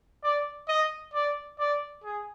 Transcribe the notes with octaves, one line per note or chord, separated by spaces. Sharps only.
D5
D#5
D5
D5
G#4